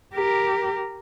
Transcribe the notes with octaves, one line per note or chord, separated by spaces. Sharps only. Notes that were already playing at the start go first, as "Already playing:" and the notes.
G4 A#4